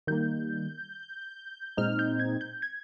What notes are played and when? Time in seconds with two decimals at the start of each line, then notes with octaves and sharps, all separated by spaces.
0.07 D#3 G3 A#3 G6
1.77 A#2 G#3 C4 D#4 F6
1.99 G6
2.20 G#6
2.41 G6
2.62 G#6